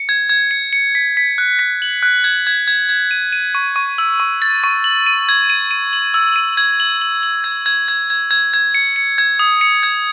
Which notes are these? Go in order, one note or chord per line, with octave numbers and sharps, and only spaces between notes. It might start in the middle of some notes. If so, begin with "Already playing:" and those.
Already playing: C#7
G#6
G#6
C#7
C#7
B6
B6
F#6
B6
F#7
F#6
G#6
G#6
G#6
G#6
D#7
D#7
C#6
C#6
E6
C#6
A6
C#6
F#7
D#7
G#6
D#7
D#7
F#7
E6
D#7
G#6
F#7
F#7
F#7
G#6
G#6
G#6
G#6
G#6
G#6
C#7
C#7
G#6
D#6
C#7
G#6